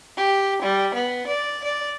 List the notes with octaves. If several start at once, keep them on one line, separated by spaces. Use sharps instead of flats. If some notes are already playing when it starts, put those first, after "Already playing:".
G4
G3
B3
D5
D5